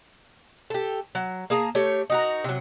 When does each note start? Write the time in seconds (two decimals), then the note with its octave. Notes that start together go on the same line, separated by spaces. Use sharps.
0.70 G4 A4
1.15 F#3
1.50 A#3 G#4 A5 A#5
1.75 A3 G4 C#5
2.10 D#4 F#4 A#4
2.44 C3 F#3